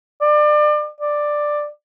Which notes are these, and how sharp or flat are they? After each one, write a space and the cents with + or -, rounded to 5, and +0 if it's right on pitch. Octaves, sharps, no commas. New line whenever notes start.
D5 +30
D5 +10